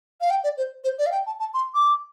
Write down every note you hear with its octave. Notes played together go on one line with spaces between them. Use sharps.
F5
G5
D5
C5
C5
D5
F5
G5
A5
A5
C6
D6